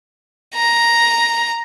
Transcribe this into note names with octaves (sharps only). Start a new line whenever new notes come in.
A#5